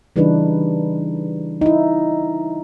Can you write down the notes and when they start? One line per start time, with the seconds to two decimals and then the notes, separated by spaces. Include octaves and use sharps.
0.16 C#3 E3 G3 D4 D#4 B4
1.62 D#4 E4